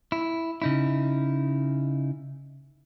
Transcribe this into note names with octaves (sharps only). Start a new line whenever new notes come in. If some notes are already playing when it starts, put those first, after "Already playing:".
E4
C#3 D#4 E4